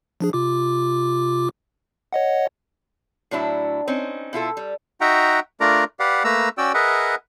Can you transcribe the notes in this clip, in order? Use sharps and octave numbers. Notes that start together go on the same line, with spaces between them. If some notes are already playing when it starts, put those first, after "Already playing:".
F3 D4 G#4
C3 F4 D6
C#5 D#5 F#5
A2 F#3 D4 E4
C4 C#4 D#4
B2 E4 F4 A4
G3
D#4 F#4 E5 F#5 G5 A#5
A3 D4 F4 A#4 D5 A#5
G4 B4 D5 F5 F#5
A3 A#3 B4 A#5 E6
C#4 F#4 D5 G5 E6
G#4 A#4 B4 D#5 E5 F#5